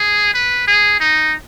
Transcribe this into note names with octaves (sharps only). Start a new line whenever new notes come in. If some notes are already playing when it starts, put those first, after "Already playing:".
Already playing: G#4
B4
G#4
D#4